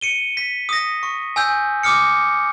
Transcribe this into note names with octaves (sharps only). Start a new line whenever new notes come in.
C#7 D#7 G7
B6
D#6 A#6
C#6
G#5 E6 G6
D6 D#6 F6 C#7